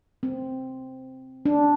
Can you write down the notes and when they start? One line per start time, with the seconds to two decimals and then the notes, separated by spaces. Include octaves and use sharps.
0.23 C4
1.45 D4